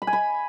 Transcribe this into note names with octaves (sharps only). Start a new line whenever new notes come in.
B5
G#5
B5